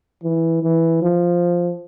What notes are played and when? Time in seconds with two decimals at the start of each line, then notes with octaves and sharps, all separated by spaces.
0.23 E3
0.63 E3
1.02 F3